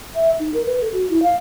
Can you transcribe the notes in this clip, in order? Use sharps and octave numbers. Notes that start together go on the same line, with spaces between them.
E5
D#4
A#4
B4
A4
F#4
E4
F5